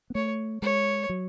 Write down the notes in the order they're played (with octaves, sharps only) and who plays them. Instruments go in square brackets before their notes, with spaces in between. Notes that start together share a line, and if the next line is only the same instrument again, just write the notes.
[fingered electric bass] B3
[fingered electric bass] A3 [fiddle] C#5
[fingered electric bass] G#3 [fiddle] C#5
[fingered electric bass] F#3